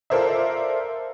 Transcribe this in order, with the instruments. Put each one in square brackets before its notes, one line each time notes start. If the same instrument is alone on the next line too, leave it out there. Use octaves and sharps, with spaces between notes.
[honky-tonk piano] F4 A4 A#4 C5 D5 E5